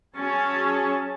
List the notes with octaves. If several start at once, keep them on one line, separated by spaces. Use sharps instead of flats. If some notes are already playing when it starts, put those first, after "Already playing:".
F#3 C#4 G#4 A5